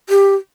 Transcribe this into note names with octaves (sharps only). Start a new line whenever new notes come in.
G4